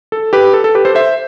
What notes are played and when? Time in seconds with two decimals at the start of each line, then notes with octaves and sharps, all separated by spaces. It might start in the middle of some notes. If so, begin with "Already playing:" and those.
0.12 A4
0.33 G4 B4
0.54 A4
0.64 A4
0.75 G4 B4
0.85 A4 C5
0.95 C5 E5